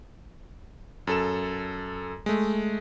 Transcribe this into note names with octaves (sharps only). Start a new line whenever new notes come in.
F#2 A4 E7
G#3 A3